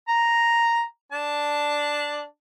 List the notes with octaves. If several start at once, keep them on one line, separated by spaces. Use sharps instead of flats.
A#5
D4 A5